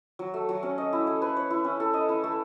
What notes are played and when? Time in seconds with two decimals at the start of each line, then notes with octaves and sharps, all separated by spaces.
0.19 F#3
0.34 A3
0.49 F#3
0.63 C#4
0.78 D#5
0.93 E4
1.07 A3
1.22 B4
1.37 C#5
1.51 E4
1.64 C#4
1.80 A4
1.94 D#5
2.09 E4
2.24 A3